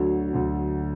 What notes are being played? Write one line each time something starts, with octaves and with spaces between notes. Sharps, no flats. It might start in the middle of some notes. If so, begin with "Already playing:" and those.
Already playing: D2 D3 F#3
D2 D3 F#3